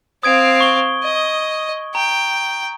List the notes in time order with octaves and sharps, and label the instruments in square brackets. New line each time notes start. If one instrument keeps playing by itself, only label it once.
[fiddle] C4 F5 [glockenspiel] D#6 G#6 D7
[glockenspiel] C#6 G7
[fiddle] D#5
[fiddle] G5 [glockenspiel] A#5